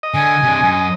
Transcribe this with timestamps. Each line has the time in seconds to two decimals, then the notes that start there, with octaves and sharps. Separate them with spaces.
0.03 D#5
0.14 D3 G#5
0.43 C3 D4
0.63 F#2